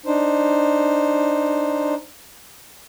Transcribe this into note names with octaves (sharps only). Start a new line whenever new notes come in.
D4 D#4 C5